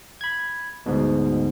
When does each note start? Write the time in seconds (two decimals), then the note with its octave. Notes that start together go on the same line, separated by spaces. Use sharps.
0.21 B5 G#6
0.86 D2 G#2 B2